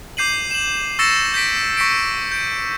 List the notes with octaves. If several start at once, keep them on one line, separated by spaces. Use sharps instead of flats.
D6 G6 C7 D#7 F#7
E7 F#7
C#6 E6 A6 A#6 C#7 E7
G6 A#6 B6 D7
C#6 A#6 B6 C#7 D7
G6 D7